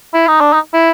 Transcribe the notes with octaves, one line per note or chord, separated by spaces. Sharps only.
E4
D#4
D4
D#4
E4